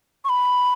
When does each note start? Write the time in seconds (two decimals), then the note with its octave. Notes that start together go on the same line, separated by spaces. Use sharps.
0.25 C#6
0.29 B5